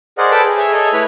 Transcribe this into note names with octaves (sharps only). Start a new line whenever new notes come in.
G#4 A#4 C5 D5 D#5 F#5
A4 B4 G5 A5 B5
G#4
G#4 C#5 E5 G#5
A4 D#5 G#5 A#5
A3 E4 B4 C#5 B5